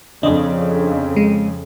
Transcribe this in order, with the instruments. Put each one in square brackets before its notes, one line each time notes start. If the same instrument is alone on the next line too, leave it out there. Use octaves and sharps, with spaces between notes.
[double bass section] F2 C#3 [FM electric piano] D4 D#5
[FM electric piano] G#3